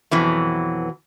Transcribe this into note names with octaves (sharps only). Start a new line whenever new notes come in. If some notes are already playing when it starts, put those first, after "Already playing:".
F2 B2 E3 F#3